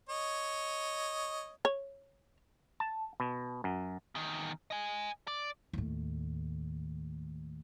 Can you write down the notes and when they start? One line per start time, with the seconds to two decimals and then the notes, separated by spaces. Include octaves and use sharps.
0.09 C#5 D#5
1.65 C#5
2.80 A5
3.20 B2
3.64 F#2
4.15 E2 D#3
4.71 D#5 G#5
5.28 D5
5.73 D#2 A2